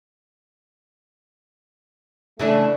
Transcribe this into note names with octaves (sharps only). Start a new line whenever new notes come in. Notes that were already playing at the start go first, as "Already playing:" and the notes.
C#3 E3 A3 D4